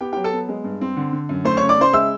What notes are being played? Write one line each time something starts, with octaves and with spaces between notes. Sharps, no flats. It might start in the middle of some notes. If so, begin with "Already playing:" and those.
B3 G4 G5
F#3 G4 G5
A4 A5
B3
G#3
G2
C4
D3
D3
F#2
A3 C5 C6
C#3 C#5 C#6
D5 D6
C#3 C5 C6
G#3 E5 E6